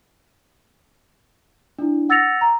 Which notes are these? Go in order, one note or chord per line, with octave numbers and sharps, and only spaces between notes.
D4 E4
F#5 E6 A6 A#6 C#7 F7
A#5